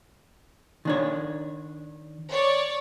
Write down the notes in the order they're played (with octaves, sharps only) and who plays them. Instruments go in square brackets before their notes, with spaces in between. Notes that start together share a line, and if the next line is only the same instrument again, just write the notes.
[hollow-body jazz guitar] D#3 D4 C#5
[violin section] C#5 D5 C#6